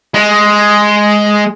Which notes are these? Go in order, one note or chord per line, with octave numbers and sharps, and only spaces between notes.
G#3